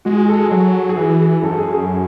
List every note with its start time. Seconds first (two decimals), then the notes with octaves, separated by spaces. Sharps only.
0.05 G#3 F#4
0.17 F#4
0.29 A4
0.40 G#4
0.51 F#3
0.89 G#4
0.97 E3 F#4
1.20 G#4
1.43 F#2 A4
1.51 G#2
1.58 F#2 G#4
1.73 G#4